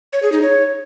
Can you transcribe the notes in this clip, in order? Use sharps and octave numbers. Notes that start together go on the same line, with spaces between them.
C#5
G#4
D#4
C#5